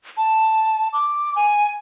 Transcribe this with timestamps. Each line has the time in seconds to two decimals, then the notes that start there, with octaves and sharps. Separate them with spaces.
0.17 A5
0.93 D6
1.36 G#5